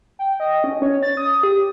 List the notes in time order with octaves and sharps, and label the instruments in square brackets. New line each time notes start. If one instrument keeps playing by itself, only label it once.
[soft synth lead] G5
D#5
C#4
C#5
A6
D#6
G4